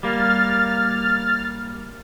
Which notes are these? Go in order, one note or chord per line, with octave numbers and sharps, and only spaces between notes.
G3 A#3 F6 A6